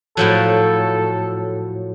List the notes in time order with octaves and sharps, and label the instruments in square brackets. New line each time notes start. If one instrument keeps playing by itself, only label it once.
[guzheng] A2 F3 F#3 [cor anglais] A4